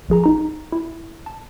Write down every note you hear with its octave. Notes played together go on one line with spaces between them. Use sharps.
A1 F3 G#4 A#5
D#4 A#5
E4
A5